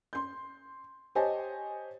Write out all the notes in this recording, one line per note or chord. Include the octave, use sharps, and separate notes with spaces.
C6 G6
G4 C5 C#5 D#5 G#5 A5